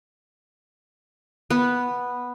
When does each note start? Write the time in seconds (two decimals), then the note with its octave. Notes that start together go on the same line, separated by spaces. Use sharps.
1.50 B3